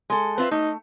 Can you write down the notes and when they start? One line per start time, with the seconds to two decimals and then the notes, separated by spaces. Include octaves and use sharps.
0.10 G#3 A4
0.38 C4 F4 B4 E5
0.51 A3 D#4